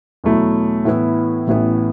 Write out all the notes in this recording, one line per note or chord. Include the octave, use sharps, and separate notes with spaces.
E2 B2 F#3 A3 E4
A2 E3 B3 E4
A1 A2 E3 B3